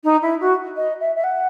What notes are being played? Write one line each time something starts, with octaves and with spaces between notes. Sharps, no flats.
D#4
E4
F#4
D#5
E5
E5
F#5